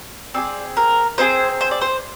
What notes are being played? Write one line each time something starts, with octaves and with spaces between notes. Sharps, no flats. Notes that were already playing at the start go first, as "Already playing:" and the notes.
C4 D#4 G#4 D5
A#4
C4 D#4 G#4 C5
C5
D5
C5